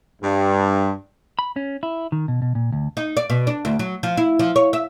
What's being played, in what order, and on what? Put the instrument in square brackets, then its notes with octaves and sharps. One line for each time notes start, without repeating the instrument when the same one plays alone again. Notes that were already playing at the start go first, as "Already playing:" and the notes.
[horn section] G2
[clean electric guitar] B5
C#4
E4
D#3
B2
B2
A#2
D2
[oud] D#4
D5
B2
D4
D2
F#3
F3
E4
F3
C#5
E5